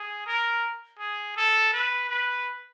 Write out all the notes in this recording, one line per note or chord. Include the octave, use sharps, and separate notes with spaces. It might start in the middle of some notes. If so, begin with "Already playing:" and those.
Already playing: G#4
A#4
G#4
A4
B4
B4